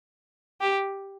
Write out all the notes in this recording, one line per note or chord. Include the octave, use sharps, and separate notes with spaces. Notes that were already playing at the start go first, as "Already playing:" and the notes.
G4